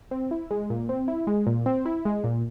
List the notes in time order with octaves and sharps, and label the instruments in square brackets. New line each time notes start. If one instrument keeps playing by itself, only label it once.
[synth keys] C4
E4
G#3
A#2
C4
E4
G#3
A#2
C4
E4
G#3
A#2